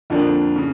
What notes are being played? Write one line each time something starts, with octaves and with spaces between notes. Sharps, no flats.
F2 D3 F3 A#3 D4
C#3